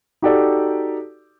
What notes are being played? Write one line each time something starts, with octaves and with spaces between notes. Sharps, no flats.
D#4 F#4 G4 A4 D5